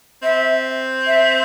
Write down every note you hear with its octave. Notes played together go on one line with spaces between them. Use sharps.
C4 E5
E5